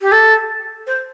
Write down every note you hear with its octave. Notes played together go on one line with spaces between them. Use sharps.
G4
A4
C5